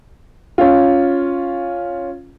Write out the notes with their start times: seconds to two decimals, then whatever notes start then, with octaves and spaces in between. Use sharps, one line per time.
0.58 C#4 F4